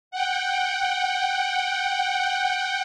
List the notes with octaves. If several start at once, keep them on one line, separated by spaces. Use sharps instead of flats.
F#5 G5